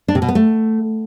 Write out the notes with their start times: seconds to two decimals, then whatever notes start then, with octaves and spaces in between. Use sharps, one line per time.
0.08 D4
0.15 C3
0.22 B2
0.29 B3
0.35 A3